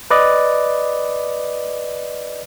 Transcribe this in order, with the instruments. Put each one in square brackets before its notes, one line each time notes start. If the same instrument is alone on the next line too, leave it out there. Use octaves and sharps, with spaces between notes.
[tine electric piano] B4 D5 D#5